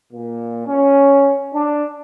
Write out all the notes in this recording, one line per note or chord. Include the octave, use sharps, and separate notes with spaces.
A#2
C#4
D4